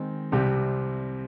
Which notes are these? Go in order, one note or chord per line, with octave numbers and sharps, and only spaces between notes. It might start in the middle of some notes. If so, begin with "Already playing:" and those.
Already playing: D#3 G#3 C4
C2 C3 G3 C4 G4